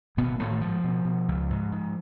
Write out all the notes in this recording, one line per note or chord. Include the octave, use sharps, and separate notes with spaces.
G#1 B2 B3
G#1 A2 A3
G#2 F3
B2
B2
C#2
G#2
G#2